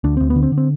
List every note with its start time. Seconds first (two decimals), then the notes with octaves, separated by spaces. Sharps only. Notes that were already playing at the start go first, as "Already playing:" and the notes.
0.04 D2 D4
0.17 D2 C4
0.30 B3
0.36 D3
0.43 C4
0.52 D3
0.58 C4